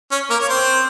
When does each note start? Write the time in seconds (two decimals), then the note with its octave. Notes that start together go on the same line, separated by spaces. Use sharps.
0.12 C#4
0.30 A#3 A#4
0.40 C#5
0.49 C4 C5